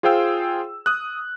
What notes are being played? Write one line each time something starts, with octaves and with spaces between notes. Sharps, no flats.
F4 G#4 C5 F5 G5 E6
D#6 F#6